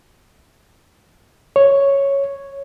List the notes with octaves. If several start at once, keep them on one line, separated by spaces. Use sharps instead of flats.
C#5